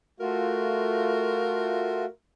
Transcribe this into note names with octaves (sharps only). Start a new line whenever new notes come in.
A3 F4 F#4 A#4